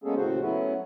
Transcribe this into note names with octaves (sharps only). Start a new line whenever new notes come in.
G#3 A#3 B3 C#4 G#4 A4
D#2 A2 C#3 F#4 C5
F#3 A3 B3 C#4 E4